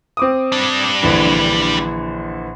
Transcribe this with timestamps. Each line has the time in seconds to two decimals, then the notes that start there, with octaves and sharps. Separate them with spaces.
0.17 C4 D6 D#6
0.52 G3 D4
1.03 A#1 D3 E3